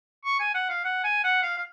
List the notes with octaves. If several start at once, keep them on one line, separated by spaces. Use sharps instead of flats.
C#6
G#5
F#5
F5
F#5
G#5
F#5
F5
F5